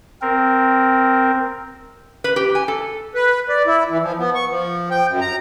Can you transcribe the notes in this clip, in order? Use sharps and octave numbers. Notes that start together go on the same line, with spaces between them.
C4 A#4
B4
G4
G#5
A4
B4
D5
E4
E3
F3
B3
C#6
F3
G5
F#2
A#5